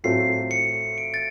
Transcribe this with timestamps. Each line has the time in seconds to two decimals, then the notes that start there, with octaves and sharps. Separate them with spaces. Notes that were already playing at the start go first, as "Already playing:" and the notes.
0.04 A2 F#3 A3 C4 F4 C7
0.51 C#7
0.98 D7
1.14 A6